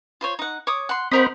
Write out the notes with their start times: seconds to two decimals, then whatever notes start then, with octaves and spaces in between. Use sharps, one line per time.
0.21 F4 C5 C#5
0.39 D#4 F#5
0.67 C#5 D6 D#6
0.89 F#5 C6
1.12 C4 F#4 A#4 C5 D#5 B5